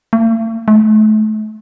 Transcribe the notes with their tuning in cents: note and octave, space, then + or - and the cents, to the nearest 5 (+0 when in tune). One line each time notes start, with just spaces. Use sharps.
A3 +45
A3 -35